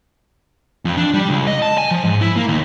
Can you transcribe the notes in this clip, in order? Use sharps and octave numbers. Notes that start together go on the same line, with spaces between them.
F2
D4
G3
C#2
D#5
A5
G#5
F3
G#2
E4
A#3
D#2